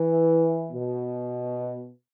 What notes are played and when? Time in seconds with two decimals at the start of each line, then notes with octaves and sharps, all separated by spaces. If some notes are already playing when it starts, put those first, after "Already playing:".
Already playing: E3
0.71 B2